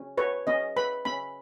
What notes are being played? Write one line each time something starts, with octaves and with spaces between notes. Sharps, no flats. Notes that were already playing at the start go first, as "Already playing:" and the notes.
Already playing: C#4
B4 C#5
C#4 D#5
B4 B5
C#4 B5